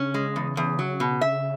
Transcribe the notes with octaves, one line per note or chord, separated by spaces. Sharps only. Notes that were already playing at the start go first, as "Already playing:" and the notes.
Already playing: C#3 C#4
G#3
E2
E2
F#3
B2
C#3 E5